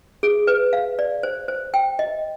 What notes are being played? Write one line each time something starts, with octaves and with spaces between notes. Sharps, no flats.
G#4
B4
F5
D5
C5
C5
G5
D#5